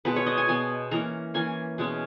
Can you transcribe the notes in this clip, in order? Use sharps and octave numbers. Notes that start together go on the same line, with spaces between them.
B2 G#3 B3 B4
C#5
D#5
G#5
B2 G#3 B3 G#5
E3 A#3 C#4 A#5
E3 A#3 C#4 G#5
B2 G#3 C#4